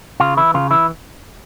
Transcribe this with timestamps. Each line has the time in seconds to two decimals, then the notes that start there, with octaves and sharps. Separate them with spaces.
0.20 C#3 F4
0.37 E3 E4
0.54 C#3 F4
0.70 E3 E4